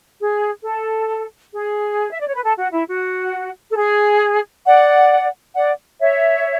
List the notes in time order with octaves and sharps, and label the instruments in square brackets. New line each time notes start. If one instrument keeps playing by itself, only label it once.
[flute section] G#4
A4
G#4
E5
D5
C#5
B4
A4
F#4
E4
F#4
A4
G#4
D5 F#5
D5 F#5
C#5 E5